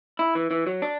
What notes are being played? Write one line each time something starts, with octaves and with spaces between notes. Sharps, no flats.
E4
E3
E3
F#3
D4